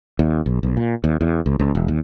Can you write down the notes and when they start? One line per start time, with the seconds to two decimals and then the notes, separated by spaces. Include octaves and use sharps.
0.19 D#2
0.46 B1
0.63 B1
0.77 A#2
1.04 D#2
1.21 E2
1.46 C#2
1.59 C#2
1.75 E1
1.88 D#2